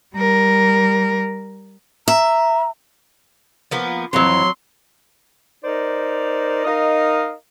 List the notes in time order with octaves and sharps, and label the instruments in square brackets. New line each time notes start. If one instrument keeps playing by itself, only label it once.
[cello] G3 A#4
[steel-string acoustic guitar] E5 [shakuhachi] A#5
[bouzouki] F3 A#3 B3
[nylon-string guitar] F2 E3 [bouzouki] F#3 C#5 [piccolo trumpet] C6
[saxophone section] D#4 A#4 C5 D5
D#4 A#4 D#5 F5